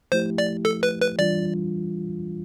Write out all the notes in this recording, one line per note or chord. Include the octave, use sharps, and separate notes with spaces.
F3 A3 E4 G4 C5
D5
A4
B4
B4
E3 G3 D4 F4 D5